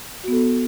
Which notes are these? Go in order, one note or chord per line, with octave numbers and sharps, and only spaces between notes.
B3 F#4 A4